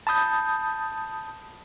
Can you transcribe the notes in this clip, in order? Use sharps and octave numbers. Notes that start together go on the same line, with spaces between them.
A5 B5 D#6 G6